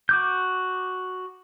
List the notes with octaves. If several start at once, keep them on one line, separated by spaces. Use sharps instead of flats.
F#4 D6 G6